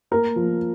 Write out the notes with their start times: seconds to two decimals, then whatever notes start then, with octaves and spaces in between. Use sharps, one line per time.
0.11 A#3 A#4
0.36 F3